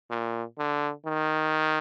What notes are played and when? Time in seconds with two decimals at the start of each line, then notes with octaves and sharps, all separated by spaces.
0.10 A#2
0.58 D3
1.06 D#3